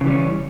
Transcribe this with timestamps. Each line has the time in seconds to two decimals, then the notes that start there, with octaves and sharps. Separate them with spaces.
0.01 C#3
0.04 E3
0.07 G3
0.10 C#4